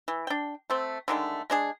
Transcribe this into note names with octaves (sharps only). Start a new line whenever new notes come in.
E3
D4 G5
A3 C4
D3 D#3 G#3 A3
G#3 D4 G#4